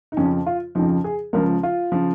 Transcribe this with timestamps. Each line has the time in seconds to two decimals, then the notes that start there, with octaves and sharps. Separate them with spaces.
0.12 D#4
0.17 F2 C#3 F3 C#4
0.46 F4
0.75 F2 C#3 F3 D#4
1.04 G#4
1.33 C#2 C#3 F3 A#4
1.63 F4
1.92 C#3 F3